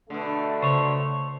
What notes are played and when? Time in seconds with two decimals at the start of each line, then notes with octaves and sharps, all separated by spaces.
0.10 B2 D3 A3
0.62 C#3 C5 C#5